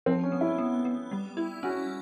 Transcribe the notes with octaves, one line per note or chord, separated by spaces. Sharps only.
F3 C4
C#4
B3
E4
B3
B3
G3
E4
C#4 F#4